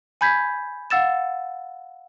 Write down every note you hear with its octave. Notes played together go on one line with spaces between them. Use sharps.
G#5 B5 G6 G#6 B6
F5 F#5 E6 A6 E7